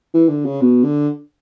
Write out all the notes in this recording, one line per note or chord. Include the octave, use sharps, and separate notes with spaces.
E3
D3
C#3
B2
D3